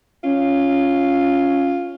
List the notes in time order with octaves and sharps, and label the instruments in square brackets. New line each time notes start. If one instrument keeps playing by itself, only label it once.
[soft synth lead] C#4 [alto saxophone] F4